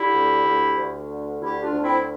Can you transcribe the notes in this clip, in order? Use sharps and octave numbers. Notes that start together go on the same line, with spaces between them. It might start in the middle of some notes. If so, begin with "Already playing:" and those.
Already playing: D3 E4 G4
D2
D2
D2
D3
D2 E4 G4
D4 F4
D2
C4 E4